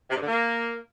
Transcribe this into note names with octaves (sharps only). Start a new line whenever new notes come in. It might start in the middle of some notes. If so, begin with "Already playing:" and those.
C3
G2
D3
A#3